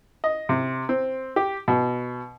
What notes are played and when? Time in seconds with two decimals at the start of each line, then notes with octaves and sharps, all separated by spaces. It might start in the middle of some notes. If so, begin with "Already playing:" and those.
0.24 D#5
0.49 C3
0.89 C4
1.36 G4
1.68 B2